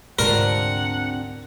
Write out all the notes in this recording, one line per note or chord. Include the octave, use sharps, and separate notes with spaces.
D2 G#2 C3 G#3 D4 F4 A#4 F#5